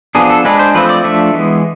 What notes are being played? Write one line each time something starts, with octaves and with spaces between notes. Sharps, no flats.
F3 B3 D4 G#4
A4
G#3 D4 B4
C5
F3 A3 C4 B4
D5
F3 A3 D4 E5
E3 G#3 B3